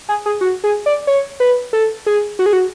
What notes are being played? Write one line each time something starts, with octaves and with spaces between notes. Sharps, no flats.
G#4
G#4
F#4
G#4
D5
C#5
B4
A4
G#4
F#4
G#4
F#4